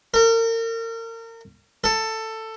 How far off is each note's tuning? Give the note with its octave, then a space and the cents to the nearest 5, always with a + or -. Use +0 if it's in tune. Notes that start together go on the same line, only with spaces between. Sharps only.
A#4 -35
A4 +15